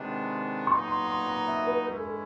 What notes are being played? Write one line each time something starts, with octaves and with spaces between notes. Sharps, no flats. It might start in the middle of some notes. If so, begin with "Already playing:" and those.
Already playing: C3 D#3 G#3 B3 D4
A#2 F#3 B3 D#4 C#6
C6
C6
A#5
E5
B4
G2 E3 G#3 C#4 E4 A#4
A4